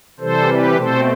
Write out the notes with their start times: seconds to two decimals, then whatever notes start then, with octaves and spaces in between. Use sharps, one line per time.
0.20 C3 E3 G3 A4 C5
0.48 G4 B4
0.76 B2 A3 C4 A4 C5